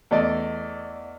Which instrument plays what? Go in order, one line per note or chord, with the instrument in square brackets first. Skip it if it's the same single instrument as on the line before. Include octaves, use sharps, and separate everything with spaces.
[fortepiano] E2 A3 D5 D#5